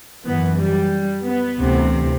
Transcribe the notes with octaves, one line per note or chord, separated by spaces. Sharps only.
F#2 E3 B3
G3
B3
D2 C3 E3